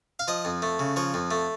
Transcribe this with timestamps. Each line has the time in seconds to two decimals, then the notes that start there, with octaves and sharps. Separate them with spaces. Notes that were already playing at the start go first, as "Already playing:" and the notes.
0.19 F5
0.28 F3 D#5
0.45 F2
0.62 A3
0.79 C#3
0.96 F3 C#5
1.14 F2
1.31 A3